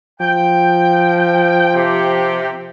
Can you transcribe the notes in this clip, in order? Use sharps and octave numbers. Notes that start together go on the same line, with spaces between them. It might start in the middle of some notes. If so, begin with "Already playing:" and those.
F3 G5
C3 G4